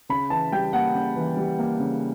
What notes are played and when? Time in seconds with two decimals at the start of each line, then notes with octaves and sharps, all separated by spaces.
0.09 C#3 B5
0.30 E3 A5
0.52 G3 G5
0.73 A#3 F#5
0.94 C#3
1.16 E3
1.37 G3
1.59 A#3
1.80 C#3